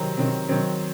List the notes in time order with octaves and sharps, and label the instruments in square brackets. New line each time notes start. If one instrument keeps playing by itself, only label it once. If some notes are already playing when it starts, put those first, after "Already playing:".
Already playing: [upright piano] C3 D#3 F#3 C4 A#5
C3 D#3 F#3 C4
D#3 F#3 C4